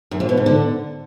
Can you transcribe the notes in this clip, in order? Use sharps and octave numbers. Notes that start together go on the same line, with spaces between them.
F#2
F2
B2
G#2
D3